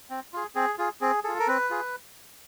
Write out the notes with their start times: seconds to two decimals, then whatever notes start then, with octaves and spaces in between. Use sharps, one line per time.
0.10 C4
0.33 F4 G#4
0.55 C4 G#4
0.78 F4 G#4
1.01 C4 G#4
1.24 F4 G#4 A4
1.39 A#4
1.47 C4 B4
1.70 F4 G#4